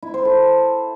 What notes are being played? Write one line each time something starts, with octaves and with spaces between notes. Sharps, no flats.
E4
C5
A4